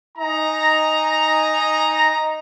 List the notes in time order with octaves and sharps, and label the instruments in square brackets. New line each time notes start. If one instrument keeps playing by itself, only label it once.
[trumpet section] D#4 G#5 A#5